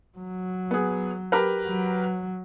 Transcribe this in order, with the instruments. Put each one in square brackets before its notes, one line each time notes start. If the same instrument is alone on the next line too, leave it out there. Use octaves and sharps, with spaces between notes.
[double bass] F#3
[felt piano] B3 G#4
G4 A#4 B4
[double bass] F#3